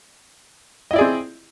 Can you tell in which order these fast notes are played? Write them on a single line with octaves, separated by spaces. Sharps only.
D#5 E4 D5 G#4 C4